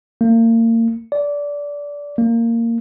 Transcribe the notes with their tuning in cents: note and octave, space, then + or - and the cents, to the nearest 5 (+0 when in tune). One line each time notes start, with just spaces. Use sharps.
A#3 -35
D5 -20
A#3 -15